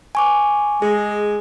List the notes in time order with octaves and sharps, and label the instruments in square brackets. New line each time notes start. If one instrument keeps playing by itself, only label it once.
[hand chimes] G#5 C#6 D6
[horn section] G#3 [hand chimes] G#4